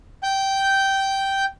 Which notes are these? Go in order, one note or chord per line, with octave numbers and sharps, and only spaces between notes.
G5 G6